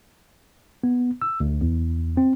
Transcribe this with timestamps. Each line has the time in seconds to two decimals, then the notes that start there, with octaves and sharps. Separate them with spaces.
0.84 B3
1.22 E6
1.40 D2
1.61 E2
2.17 C4